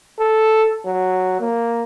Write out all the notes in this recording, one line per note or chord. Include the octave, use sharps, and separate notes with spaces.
A4
F#3
A#3